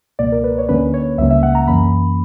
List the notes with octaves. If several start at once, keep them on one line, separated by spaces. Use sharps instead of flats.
C#2 B2 A#3 D5
A#4
B4
C#5
D2 D3 A#3 C#4 B4
C#5
C#2 C#3 G3 A#3 C#4 E5
E5
F#5
A#5
F#2 E3 A#3 C#4 B5